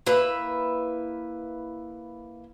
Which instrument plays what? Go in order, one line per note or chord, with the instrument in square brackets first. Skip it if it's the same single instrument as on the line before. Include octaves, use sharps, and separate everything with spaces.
[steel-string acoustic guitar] A#3 E4 B4 E5